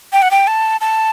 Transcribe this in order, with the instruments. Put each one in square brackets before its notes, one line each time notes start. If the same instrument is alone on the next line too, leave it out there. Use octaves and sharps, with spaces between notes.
[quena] G5
F#5
G5
A5
A5